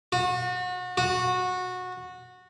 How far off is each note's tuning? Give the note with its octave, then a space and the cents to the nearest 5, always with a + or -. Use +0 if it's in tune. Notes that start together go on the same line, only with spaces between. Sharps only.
F#4 -35
F#4 -20